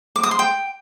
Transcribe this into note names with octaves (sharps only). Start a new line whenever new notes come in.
D6
D#6
C6
G5